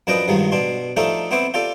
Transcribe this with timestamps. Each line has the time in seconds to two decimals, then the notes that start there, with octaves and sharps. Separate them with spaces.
0.07 F#2 F3 D4 B4 D#5 G5
0.28 G2 D#3 F3 F#3 G#3
0.52 B2 D4 C6
0.97 F3 A3 D4 D#4 G4 A4
1.31 B3 C4 E4 C5 D6
1.54 F4 G4 A4 D5